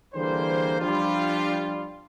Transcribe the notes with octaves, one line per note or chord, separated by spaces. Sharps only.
D3 E3 G3 A#3 G#4 C5
F3 G3 D4 F4